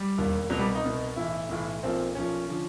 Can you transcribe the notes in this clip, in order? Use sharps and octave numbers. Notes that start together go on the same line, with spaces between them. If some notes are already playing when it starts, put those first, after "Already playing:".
Already playing: G3
E1 D#2 D#3
C2 B2 F#3
G3
D#4
C2 B2
B1 A2 E3 E4
B1 A2 E3
B1 A#2 F3 C4
B1 A#2 F3 C#4
D3 F3